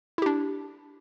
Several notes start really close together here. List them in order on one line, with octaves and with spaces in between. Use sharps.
E4 G4 D4